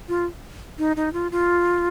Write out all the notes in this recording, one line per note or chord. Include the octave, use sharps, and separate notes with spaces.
F4
D#4
D#4
F4
F4